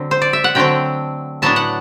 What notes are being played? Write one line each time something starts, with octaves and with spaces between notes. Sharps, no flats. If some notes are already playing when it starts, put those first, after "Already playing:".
Already playing: D3 F#3 C4
C5
D5
E5
F#5
D3 F#3 A3 C4 G5
A2 F#3 B3 D4 A5
F#5